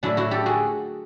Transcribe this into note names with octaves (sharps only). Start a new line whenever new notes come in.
A2 F#3 D4 E4
E4 F#4
G4 A4
F#4 G#4